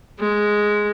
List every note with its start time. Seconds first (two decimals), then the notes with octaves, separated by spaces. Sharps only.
0.19 G#3